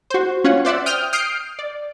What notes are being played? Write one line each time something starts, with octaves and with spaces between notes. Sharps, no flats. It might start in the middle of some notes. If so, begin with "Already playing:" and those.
F#4 C5
C#4 F4 F#5
C5 D5 E5 F#5
G5 D#6 F6 G6
D#6 F6 G6 C7 D7
D5